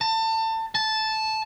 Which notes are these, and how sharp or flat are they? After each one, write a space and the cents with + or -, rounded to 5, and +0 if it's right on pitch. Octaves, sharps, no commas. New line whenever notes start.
A5 +30
A5 -10